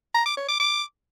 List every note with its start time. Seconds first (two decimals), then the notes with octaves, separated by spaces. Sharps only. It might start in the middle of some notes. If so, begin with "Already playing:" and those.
0.14 A#5
0.26 D6
0.37 C#5
0.49 D6
0.60 D6